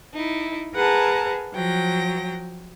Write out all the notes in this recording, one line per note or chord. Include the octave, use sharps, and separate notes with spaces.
D#4 E4
G#4 A#4 B4 F#5 A5 A#5
F3 F#3 G5 A#6